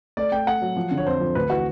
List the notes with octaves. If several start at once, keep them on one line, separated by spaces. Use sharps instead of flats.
A3 D5
A3 G5
A3 F#5
F#3
F3
D3
C#5
F2 C5
F3
D2 B4
E3 F#4